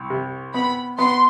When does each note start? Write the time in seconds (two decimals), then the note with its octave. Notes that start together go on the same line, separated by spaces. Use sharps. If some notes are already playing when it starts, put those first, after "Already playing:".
Already playing: C2
0.10 C3
0.54 B3 B5
0.98 B3 C6